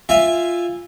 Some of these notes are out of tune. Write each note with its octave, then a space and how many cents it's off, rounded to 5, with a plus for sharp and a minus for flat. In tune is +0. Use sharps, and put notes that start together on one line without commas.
F4 -5 E5 +0 G#5 -20